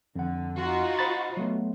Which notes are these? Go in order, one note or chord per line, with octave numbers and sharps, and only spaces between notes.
F2 D3 F#5
D#4 F4 F#4
C5 B5 A6
F#3 A3 B3